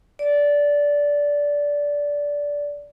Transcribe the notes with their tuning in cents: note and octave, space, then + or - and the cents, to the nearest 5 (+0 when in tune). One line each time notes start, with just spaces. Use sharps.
D5 -15